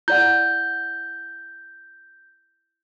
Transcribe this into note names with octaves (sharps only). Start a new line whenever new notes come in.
E4 D5 F#5 G6